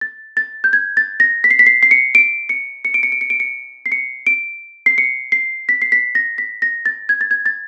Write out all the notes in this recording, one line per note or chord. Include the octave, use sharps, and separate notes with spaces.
A6
A6
G6
G#6
A6
A#6
B6
C7
B6
C7
C7
C#7
D7
C#7
C#7
D7
C#7
D7
C#7
D7
C#7
C7
C#7
D7
C7
C#7
C7
B6
C7
B6
A#6
B6
A#6
A6
G#6
A6
G#6
A6